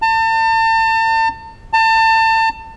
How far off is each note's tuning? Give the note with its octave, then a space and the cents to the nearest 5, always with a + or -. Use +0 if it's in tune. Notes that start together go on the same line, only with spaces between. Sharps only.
A5 +35
A5 +30